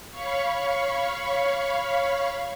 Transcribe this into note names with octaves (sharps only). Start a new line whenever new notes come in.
C#5 F5 B5 C#6